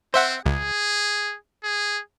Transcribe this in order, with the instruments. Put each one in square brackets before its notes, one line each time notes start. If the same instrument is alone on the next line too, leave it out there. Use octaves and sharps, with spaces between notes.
[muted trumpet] C4 [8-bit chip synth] C5 E5 F#5
[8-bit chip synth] C#2 [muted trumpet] G#4
[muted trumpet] G#4